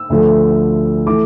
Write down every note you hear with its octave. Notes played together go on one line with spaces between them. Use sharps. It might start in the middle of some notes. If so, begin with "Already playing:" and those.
Already playing: E6
D2 D3 F3 A3
E3 A3 D6